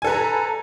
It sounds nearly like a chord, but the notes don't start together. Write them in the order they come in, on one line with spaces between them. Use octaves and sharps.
G#5 A4 B4 A#5